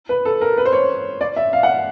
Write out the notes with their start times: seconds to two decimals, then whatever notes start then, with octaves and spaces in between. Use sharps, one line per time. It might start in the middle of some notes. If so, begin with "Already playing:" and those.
0.09 B4
0.25 A4
0.41 A#4
0.57 B4
0.65 C5
0.73 C#5
1.21 D5
1.36 E5
1.53 F5
1.63 F#5